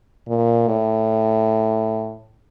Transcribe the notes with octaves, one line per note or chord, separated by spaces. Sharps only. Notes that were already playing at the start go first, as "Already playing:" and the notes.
A#2
A2